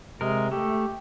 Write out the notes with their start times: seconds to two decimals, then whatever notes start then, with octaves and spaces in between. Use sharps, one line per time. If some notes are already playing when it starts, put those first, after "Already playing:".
0.21 C3 G#3 A#4
0.51 A3 G4